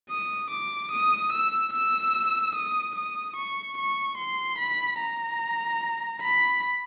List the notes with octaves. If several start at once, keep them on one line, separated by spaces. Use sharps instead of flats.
D#6
D6
D#6
E6
E6
D#6
D#6
C#6
C#6
C6
B5
A#5
B5